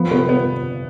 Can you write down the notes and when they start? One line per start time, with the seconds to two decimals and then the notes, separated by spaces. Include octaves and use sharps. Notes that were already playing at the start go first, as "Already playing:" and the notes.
Already playing: F3 B3
0.11 C3 B3
0.29 B3